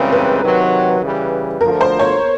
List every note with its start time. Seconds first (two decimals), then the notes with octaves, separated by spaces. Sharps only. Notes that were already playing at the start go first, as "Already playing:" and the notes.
Already playing: C#2 C#3 E3 G3 C4 A#4 B4
0.12 B4
0.43 C3 D#3 F#3
1.01 C#3 E3 G3
1.61 D2 D3 F3 A3 A#4
1.81 C5
1.99 C#5